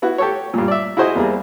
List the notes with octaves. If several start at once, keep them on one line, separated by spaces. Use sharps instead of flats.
B3 E4 F#4
G4 A4 C#5
G2 A#2
D5 E5
E4 F#4 G#4 C5 D#5 G#5
E2 G3 A#3 G#4